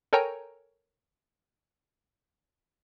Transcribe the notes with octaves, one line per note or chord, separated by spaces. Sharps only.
A4 A#4 C#5 G5 G#5 A#5